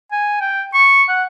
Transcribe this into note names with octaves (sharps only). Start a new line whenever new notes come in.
G#5
G5
C#6
F#5